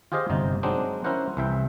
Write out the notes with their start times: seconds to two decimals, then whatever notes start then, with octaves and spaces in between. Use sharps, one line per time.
0.12 F4 G4 G#4 C5 D#5 F5
0.30 G1 C3 D#4
0.63 F#3 G#3 C4 D4 D#4
1.04 C#4 E4 A#4 C5 F#5
1.37 C2 E3 E5 G5